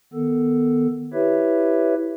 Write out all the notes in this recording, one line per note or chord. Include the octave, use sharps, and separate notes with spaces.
D#3 B3 A4
E4 G4 B4 C#5 E5